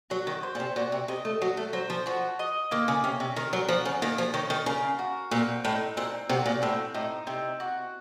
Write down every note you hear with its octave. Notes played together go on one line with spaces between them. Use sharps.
F#3 F#4
D#3
C5
A#2
C3
A#2 F#4
C3
C3 D#5
A3
F#3 F#4
A3
F#3 C5
F3
F3 F#4
D#5
D#3 A#3
C#3
C3 C#4
C3
D#3 A#4
F#3
F3 F#4
C#3
D#3 A#3
F3
D#3 C#4
D#3
C#3 A#4
F#4
A#2 C4
A2 D#4
A#2 C4
C3 F#4
A#2
A2 C4
A2 D#4
C3 C4
F#4